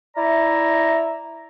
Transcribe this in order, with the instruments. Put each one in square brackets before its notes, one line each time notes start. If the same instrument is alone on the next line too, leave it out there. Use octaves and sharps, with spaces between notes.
[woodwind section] E4 D5 E5 A#5